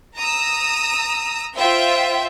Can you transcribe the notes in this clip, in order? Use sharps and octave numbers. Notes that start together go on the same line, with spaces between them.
A#5 D#6 E6
F4 C5 E5 G5